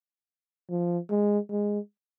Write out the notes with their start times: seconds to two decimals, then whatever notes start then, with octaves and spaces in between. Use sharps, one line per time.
0.70 F3
1.10 G#3
1.51 G#3